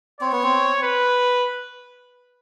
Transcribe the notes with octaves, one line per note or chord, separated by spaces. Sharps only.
C4 C#5
B3
C4
B4